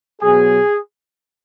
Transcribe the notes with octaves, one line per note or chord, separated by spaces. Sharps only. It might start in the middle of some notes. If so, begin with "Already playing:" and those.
B2 F#3 B3 G#4